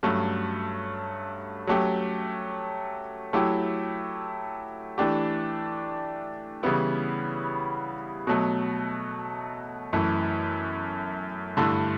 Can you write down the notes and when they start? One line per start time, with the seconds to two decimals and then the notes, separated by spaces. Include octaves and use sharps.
0.03 G2 F#3 A3 C#4
1.67 F#3 A3 C#4 G4
3.33 F#3 A3 E4 G4
4.98 E3 A3 D4 G4
6.63 C#3 E3 G3 B3 E4
8.27 B2 F#3 A3
9.93 F#2 E3 A3
11.57 G2 D3 A3 E4